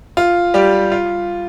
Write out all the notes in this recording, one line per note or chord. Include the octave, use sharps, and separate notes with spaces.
F4
G3 G4
F4